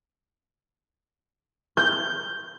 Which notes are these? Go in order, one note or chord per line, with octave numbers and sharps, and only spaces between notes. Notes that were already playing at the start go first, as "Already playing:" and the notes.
G6